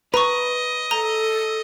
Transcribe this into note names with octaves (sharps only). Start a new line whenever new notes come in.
B4 D#5 A#5 C#6
A4 A#5 G7